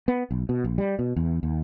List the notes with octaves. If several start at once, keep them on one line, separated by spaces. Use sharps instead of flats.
B3
B1
B2
A#1
G3
B2
E2
D#2